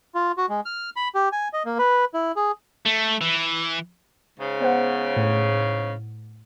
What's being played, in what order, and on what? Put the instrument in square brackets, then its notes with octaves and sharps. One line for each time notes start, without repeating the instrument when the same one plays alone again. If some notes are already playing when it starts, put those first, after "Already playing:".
[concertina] F4
F#4
G#3
F6
B5
G4
G#5
D#5
A#3
B4
E4
G#4
[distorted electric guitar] A3
E3
[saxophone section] G#2 C#3
[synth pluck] B3 C5 F#5
A2